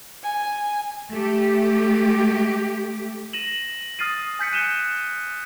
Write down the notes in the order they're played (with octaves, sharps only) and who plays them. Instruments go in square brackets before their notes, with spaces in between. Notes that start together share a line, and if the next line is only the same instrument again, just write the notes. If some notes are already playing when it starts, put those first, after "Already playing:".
[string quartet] G#5
[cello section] A3 G4
[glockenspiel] A#6 D#7 E7 F#7
D#6 F6 A6 C7 D#7
G#5 G6 B6 C#7
F#6 D#7 E7 G7